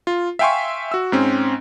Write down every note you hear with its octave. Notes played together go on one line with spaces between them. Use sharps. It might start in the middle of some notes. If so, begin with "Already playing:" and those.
F4
E5 F5 G5 G#5 C6 C#6
F#4 E6
G#2 C4 C#4